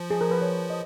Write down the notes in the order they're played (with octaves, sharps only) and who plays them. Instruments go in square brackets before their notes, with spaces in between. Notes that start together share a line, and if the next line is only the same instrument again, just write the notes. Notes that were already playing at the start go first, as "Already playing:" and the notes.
Already playing: [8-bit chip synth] F3
[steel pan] G#4
A#4
B4
C#5
D#5